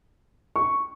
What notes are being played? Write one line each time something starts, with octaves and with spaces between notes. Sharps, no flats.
C#6